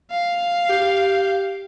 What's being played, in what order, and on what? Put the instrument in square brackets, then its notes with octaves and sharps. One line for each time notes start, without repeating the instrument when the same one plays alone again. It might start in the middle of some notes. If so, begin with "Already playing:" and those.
[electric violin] F5
[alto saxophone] G4